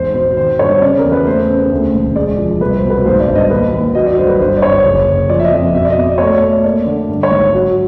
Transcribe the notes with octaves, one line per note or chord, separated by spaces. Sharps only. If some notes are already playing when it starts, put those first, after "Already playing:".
Already playing: G#1 E2 C5
B2 C5
D#3 C5
G2 C#5
C#3 D5
A#4
E2
B4
A3 C5
C#3
D2
E1
G#3 D5
F3
C2 B4
C5
B2
B4
G#1 C5
D5
G2
D#5
D#2 B4
D#2
F#3 D#5
D5
G1 C5
B4
G1 C5
D5
G1 C#5
F#1
F#1
F3 D5
E5
D#5
F2
B2 E5
D5
D#5
B2
D5
A3 C#5
D5
A3
A#3 D5
D3
G2
C#5
G#1
F#3